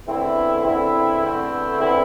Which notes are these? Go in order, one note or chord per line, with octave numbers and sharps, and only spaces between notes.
E2 D3 A3 C4 E4
E2 D3 A3 C4 E4
E2 D3 A3 C4 E4
E2 D3 A3 C4 E4